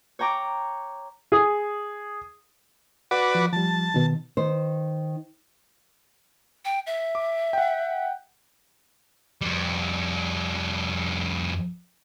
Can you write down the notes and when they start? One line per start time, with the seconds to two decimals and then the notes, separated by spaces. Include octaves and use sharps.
0.19 C#5 G5 A#5 D6
1.32 G#4
3.11 F#4 B4 D5 F#5
3.35 F3
3.53 F3 G3 A5
3.94 B2 D#3
4.37 D#3 C5
6.65 G5
6.87 E5
7.15 D6
7.53 F#5 G5
9.41 F2 G3